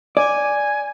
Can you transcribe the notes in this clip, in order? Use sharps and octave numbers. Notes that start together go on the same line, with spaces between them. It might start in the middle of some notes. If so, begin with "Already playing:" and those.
D5 G#5